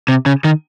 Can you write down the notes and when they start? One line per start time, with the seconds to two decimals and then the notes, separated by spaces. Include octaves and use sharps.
0.08 C3
0.26 C#3
0.44 D#3